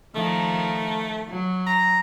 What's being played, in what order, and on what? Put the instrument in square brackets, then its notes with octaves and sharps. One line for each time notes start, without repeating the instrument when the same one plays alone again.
[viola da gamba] D#3 F3 A#4 [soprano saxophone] A3
[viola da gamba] F#3
[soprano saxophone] A#5